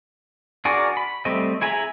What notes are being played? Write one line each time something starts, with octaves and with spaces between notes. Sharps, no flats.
D4 F#4 G#4 A#4 D5
B5
G3 A3 C4 D#5
E4 G#4 G#5 A#5 B5